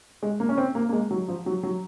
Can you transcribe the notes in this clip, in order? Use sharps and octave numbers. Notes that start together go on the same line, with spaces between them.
G#3
A#3
C#4
C4
A#3
A#3
G#3
F#3
F3
F#3
F#3